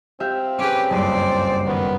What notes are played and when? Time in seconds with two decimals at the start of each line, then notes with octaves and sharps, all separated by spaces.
0.20 C4 G4 E5 F5
0.58 C#4 G4 G#4 B4
0.90 F#1 C#2 G2 C5 D5
1.66 D#3 B3